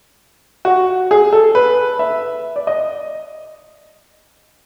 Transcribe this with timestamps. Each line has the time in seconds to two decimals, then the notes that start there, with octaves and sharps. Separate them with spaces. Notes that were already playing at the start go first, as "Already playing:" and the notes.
0.65 F#4
1.11 G#4
1.33 A4
1.55 B4
1.99 E5
2.56 D5
2.67 D#5